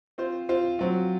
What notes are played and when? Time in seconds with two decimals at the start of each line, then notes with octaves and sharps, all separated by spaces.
0.18 C4 F4 C5
0.49 C4 F4 C5
0.79 F#3 C4 F4